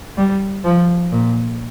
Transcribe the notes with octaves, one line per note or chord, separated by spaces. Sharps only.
G3
F3
A#2